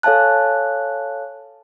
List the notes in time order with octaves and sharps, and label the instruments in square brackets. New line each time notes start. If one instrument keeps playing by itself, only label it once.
[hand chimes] A4 C#5 F5 G#5 A5 F#6